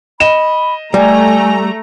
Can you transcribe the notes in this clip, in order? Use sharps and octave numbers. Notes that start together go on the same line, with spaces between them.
D#5 B5 E7
G3 A3 G#5 A#5